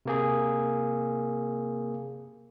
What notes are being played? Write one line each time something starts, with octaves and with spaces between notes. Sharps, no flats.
C3 A#3 G#4